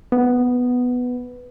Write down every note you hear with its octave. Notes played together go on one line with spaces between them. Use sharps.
B3